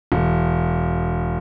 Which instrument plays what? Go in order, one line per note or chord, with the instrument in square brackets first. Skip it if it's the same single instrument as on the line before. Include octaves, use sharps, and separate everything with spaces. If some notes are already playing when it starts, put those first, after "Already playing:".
[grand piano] E1